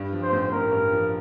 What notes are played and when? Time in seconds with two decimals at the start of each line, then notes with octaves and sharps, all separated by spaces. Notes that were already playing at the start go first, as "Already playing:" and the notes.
Already playing: G2 G3
0.13 F3
0.22 C5
0.32 A1
0.52 A1 A#4
0.71 G2
0.92 F3